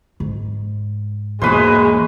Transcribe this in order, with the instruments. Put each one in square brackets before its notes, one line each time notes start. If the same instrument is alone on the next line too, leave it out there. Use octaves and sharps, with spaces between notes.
[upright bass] G#2
[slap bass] E1 E2 A#3 [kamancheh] G#3 G#4 [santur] F#4 B4 C5